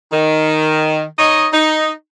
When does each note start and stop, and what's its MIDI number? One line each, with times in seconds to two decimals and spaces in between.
0.12 1.04 51
1.19 1.47 63
1.19 1.47 73
1.19 1.47 75
1.53 1.91 63